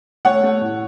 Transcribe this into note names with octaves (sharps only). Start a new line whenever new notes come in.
A3 C#5 F#5
A3
A2